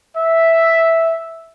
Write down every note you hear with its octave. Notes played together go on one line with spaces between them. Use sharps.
E5